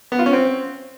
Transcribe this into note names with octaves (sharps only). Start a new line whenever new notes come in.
B3
F4
C#4
C4